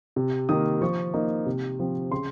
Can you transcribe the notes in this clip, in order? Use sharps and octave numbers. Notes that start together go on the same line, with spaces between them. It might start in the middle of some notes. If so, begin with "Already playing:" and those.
C3
D#3 A#3 D#6
F3 C#6
A#3 D#4
C3
F3 C4
C#3 C6